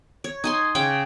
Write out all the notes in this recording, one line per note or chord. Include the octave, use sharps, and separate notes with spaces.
C#5
D#4 G#5 C6
C#3 C#5 G5 D6